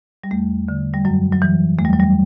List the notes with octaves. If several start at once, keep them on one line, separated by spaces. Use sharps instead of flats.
G3
E2 A3
D3
G3
F#2 F#3
F#3
E3
E2 A3
G3
F#3
G3